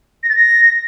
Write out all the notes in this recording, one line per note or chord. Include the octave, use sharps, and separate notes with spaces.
A#6
A6
A#6